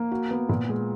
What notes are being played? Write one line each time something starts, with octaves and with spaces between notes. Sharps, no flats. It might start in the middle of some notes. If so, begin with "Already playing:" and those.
Already playing: A#3
F#4
B3
A#2
G#3